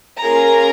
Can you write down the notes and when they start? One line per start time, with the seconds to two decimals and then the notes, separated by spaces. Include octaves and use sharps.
0.21 A#3 C#4 F4 G#4 A#4 A#5